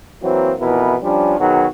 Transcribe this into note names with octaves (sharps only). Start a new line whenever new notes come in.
E3 F#3 A#3 C4 F#4
F2 B2 E3 E4 A#4
F3 G3 C#4 D4
B2 D#3 F#3 F#4 G#4